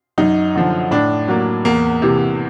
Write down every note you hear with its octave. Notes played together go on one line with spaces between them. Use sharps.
F#2 D#4
D3 F3
A2 D4
F#3 A#3
E2 A#3
C3 E3